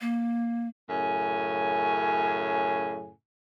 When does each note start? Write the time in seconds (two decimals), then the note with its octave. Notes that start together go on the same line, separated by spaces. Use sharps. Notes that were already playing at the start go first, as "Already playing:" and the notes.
0.01 A#3
0.90 F#2 A2 C#3 G#5